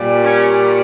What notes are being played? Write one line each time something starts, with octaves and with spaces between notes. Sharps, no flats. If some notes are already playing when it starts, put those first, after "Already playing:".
Already playing: A#2 G3
C#4